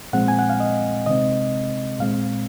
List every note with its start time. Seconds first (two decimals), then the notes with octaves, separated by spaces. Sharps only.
0.13 A#2 F3 G#3 C4 F#5
0.28 G#5
0.39 F#5
0.50 F5
0.60 D#5
1.06 C3 D#3 G#3 C4 D#5
2.00 A#2 G#3 C4 F5